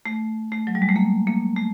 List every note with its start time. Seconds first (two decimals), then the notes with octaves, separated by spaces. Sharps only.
0.06 A3
0.52 A3
0.67 F#3
0.75 G3
0.82 G#3
0.89 A3
0.96 A#3
1.27 A#3
1.56 A3